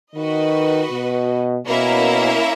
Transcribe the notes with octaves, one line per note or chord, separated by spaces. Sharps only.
D#3 F#4 B4 D#5
B2
B2 A#3 C#4 E4 A#4 E5